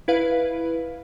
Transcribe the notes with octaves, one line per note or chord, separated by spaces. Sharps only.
E4 B4 F5